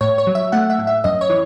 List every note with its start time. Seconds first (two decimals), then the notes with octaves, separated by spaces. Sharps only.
0.01 A2 C#5
0.18 C#5
0.27 F#3
0.35 E5
0.52 A3 F#5
0.70 E5
0.79 A2
0.87 E5
1.04 F#2 D#5
1.21 C#5
1.30 E3